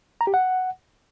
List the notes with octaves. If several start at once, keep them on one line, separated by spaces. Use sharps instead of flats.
A#5
G4
F#5